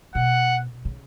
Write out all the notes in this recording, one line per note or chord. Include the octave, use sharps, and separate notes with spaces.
B2 F#5
C#3